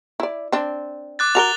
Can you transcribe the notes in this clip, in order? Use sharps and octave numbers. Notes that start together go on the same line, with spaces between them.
E4 D5
C4 D4
D6 F#6 A6
F#4 A4 A#4 F7 G7